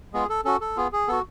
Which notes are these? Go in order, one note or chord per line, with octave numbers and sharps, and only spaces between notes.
G#3 B3 F4 G#4
A4
C#4 F#4 A4
A4
B3 F4 G#4
G#4
B3 F#4 A4